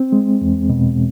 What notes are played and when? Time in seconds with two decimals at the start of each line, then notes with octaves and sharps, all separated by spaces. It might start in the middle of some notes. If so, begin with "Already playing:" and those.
Already playing: C4
0.12 G#3
0.41 E2
0.69 B2